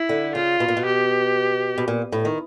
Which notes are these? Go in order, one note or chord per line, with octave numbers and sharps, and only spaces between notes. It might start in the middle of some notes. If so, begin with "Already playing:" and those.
Already playing: E4
D3
C#3 F4
B2
A#2
B2
G4
B2
A#2
A2
D#3